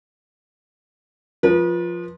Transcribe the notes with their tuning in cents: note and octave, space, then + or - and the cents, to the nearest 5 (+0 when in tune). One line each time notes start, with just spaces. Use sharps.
F3 +0 B4 -40